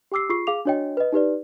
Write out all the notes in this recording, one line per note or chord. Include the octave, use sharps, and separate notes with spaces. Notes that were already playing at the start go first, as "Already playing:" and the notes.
G4 G5 D6 E6 C7
F4 G#4 C#6 C7
G#4 F5 D6 F7
D4 F#4 C#5 D#5 G5
B4 D#5
D#4 G4 B4 D5